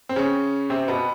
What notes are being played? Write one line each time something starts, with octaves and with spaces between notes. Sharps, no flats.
C4
C#3 C#4
C3 C4
B2 B3